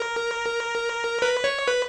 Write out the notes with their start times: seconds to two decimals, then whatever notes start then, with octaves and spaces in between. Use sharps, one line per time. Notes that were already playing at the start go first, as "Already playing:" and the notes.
Already playing: A#4
1.22 B4
1.44 C#5
1.68 B4